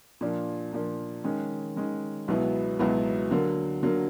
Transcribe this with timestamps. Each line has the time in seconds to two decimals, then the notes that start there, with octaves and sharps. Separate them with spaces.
0.21 A#2 F3 A#3 D4
0.73 A#2 F3 A#3 D4
1.24 D#3 G#3 C#4
1.76 D#3 G#3 C#4
2.28 C#2 B2 F#3 B3 E4
2.79 C#2 B2 F#3 B3 E4
3.31 D3 F#3 A#3
3.83 D3 F#3 A#3